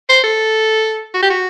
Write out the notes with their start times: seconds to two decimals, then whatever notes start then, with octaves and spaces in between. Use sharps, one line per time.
0.09 C5
0.24 A4
1.14 F#4
1.23 G4
1.30 F#4